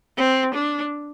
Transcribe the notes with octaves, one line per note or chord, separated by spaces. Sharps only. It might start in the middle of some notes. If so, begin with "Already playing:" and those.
C4
D4